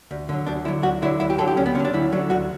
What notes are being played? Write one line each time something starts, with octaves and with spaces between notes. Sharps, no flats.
D2
D3 F#3
D2 D4
D3 F#3 E4
D2 F#4
D3 F#3 E4
D2 E4
G4
D3 F#3 A4
G4
D2 C#4
B3
D3 F#3 C#4
D4
D2 E4
D3 F#3
D2 F#4